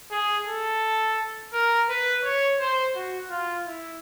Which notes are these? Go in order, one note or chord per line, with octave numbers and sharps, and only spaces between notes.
G#4
A4
A#4
B4
C#5
C5
F#4
F4
E4